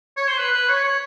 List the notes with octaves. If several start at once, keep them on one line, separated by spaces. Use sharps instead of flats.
C#5
C5
B4
B4
C#5
C#5